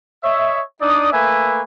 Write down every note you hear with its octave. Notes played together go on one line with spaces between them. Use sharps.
C#5 D#5 E5
D4 D#4 D5 D#6
A3 A#3 B4 E5 G#5